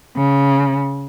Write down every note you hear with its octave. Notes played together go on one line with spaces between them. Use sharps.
C#3